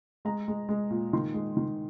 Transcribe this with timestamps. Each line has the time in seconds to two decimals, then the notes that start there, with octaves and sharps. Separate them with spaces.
0.25 G#3 A#5
0.48 G#3
0.69 G#3
0.90 A#2
1.13 D#3 C6
1.34 G#3
1.57 D#3